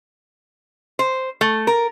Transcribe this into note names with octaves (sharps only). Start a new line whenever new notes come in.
C5
A3
A#4